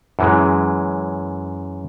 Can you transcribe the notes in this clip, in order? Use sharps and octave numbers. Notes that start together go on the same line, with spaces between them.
F#2 E3 G#3